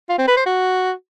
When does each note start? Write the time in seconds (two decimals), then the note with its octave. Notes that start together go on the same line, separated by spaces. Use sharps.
0.10 F4
0.19 C4
0.28 B4
0.37 C5
0.46 F#4